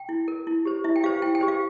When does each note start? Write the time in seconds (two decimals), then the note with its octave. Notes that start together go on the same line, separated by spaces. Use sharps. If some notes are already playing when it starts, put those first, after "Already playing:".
Already playing: G5
0.09 E4
0.28 A#4
0.47 E4
0.65 G4 C5
0.84 E4 E5
0.96 G5
1.04 G4 C5 F5
1.22 E4 G5
1.35 G5
1.41 G4 C5
1.48 F5